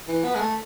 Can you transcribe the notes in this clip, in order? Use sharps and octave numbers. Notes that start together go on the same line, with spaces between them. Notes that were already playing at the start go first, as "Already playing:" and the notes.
E3
B3
G#3
A3